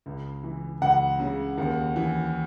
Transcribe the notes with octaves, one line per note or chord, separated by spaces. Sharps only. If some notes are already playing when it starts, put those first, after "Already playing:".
C#2
E3
C#2 F#5
C#3
D#2
E3